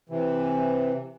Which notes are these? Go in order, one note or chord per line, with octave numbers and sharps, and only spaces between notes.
C3 E3